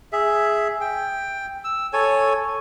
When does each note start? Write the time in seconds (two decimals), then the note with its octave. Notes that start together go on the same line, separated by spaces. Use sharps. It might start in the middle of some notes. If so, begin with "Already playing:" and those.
0.12 G#4 E5
0.81 G5
1.64 E6
1.93 A4 C#5 G#5